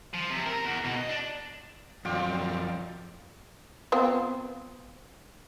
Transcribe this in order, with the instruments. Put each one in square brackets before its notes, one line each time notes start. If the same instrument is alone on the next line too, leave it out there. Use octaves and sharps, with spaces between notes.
[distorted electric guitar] F3
C3
A#4
E2
B2
D#5
D4
[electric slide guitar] F#2 F3 F#3 [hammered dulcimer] F4 D5 G5
[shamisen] B3 C4 F4